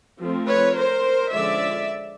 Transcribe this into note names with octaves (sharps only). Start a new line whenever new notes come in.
F3 A3 C4
B4 C#5
A#4 C5
D3 F3 G#3 C#4 D5 E5